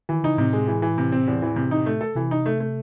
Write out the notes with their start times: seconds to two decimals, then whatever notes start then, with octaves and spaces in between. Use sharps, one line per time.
0.09 D#3 E3
0.24 C#3 D#4
0.38 A2 C3
0.53 G#3
0.68 E3
0.82 E3
0.98 C3
1.12 C4
1.28 E2
1.42 E3
1.56 C3
1.71 D#4
1.86 A3
2.01 A4
2.15 C3 E3
2.31 D#4
2.46 A3
2.60 A3